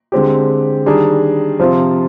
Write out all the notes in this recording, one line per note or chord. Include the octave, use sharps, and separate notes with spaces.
D3 G#3 C4 G4
D#3 G3 D4 G#4
C3 F3 C4 F4